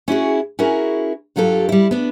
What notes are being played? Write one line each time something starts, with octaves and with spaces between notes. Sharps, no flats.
C#4 E4 F#4 G#4
C#4 E4 F#4 G#4 A#4
G2 F#3 F4 G4 A4
G3 E4
B3 D4